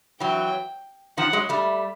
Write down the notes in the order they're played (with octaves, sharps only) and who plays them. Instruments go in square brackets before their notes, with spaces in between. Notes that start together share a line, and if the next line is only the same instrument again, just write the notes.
[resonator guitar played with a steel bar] E3 F#3 [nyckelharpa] G5
[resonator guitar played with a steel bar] D#3 F3 [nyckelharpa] F#5
[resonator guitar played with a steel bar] F#3 G#3
G3 A3